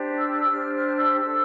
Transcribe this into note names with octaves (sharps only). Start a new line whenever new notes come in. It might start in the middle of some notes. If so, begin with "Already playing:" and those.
Already playing: D4 G4 C5
E6
D4 G4 C5 F6
F6
E6
D4 A4 C5 E6